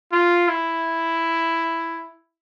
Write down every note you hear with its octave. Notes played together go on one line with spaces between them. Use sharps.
F4
E4